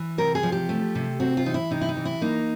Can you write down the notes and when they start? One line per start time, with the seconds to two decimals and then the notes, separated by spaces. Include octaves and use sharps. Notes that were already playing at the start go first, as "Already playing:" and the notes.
Already playing: E3
0.18 C3 A#4
0.35 G#4
0.43 F3
0.52 G4
0.69 A3
0.95 C3
1.20 C4 F#4
1.37 F4
1.46 E3 D#4
1.54 E4
1.71 C3 D#4
1.81 E4
1.89 D#4
1.97 E3
2.05 E4
2.21 A#3 D#4